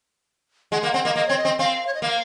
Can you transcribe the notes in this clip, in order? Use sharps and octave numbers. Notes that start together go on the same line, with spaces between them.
G#3 F#5
A#3 F#5
C4 F#5
A#3 D#5
A#3 D#5
C4 C#5
D#5
C4
C4 F5
C#5
D#5
A#3 F5